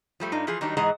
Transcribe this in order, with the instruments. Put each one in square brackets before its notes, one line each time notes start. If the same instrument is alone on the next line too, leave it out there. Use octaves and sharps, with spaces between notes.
[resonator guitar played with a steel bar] F3 G3 A3
G2 D4 D#4 F4
E3 F3 F4 G#4
D#3 F#3 G3 D4 D#4
G#2 E3 G#3 G#4 F#5 A#5